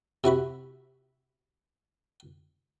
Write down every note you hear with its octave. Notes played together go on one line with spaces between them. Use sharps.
C3 E4 F#4 B5